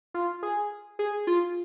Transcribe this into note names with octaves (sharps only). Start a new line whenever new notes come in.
F4
G#4
G#4
F4